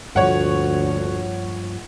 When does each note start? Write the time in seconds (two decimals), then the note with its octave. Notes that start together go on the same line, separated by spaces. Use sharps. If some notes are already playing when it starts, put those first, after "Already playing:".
0.16 D2 G2 A#2 F3 C#5 F#5